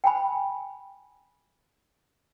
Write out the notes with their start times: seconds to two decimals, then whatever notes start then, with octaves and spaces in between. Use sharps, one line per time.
0.04 G5 G#5 B5